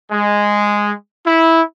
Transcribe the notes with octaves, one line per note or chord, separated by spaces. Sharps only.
G#3
E4